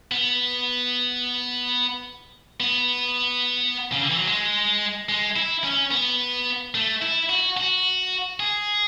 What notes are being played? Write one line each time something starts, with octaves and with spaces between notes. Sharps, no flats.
B3
B3
C#3
D3
E3
F#3
G#3
G#3
E4
C#4
B3
A3
E4
F#4
F#4
G#4